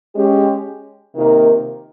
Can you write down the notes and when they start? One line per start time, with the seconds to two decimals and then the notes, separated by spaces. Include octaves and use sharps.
0.14 G#3 C#4 G4
1.16 C3 D#3 A#3 F4 A#4